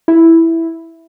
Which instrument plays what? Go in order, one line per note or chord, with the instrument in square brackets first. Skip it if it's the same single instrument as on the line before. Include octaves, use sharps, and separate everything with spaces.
[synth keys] E4